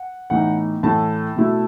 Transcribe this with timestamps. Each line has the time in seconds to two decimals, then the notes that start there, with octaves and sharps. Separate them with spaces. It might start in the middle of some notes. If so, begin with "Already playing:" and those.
Already playing: F#5
0.30 A2 E3 B3 D#4 F#5
0.83 A2 E3 A3 E4 A5
1.36 B2 A3 E4